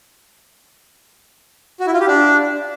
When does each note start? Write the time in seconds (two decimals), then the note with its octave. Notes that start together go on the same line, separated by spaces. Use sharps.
1.80 F#4
1.87 E4
1.94 F4
2.00 G4
2.07 D4